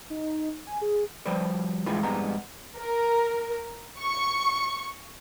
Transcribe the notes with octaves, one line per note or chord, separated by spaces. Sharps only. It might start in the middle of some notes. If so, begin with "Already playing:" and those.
D#4
G#5
G#4
F3 G3 B4 C5 D5
A2 E3 G3 G#3 F4 B4
F2 G#2 G3 G#3 B3 A#5
A#4
C#6